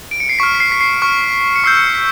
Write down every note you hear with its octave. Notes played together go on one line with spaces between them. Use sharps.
D7
C#7
C7
C#6 F6 B6
B6
C7
B6
C7
C#6 F6
C#7
C#6 E6 G6 C7
C#7
C7
B6